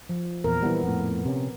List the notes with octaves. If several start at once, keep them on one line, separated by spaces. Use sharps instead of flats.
F3
E2 A#2 A#4
E3 G3 B3
F2 A2
C3 C#4